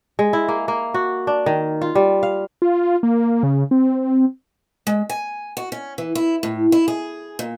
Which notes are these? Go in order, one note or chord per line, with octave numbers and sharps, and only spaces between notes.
G#3
E4
A#3
A#3
F#4
D4
D#3
F4
G3
F5
F4
A#3
C#3
C4
G#3
G#5
F#4
C#4
E3
E4
A2
E4
G#4
A#2